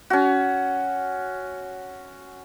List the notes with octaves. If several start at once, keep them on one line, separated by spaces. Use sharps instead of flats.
C#4 F#4